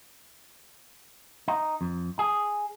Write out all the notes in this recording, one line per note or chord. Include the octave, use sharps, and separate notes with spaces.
D#4
F2
G#4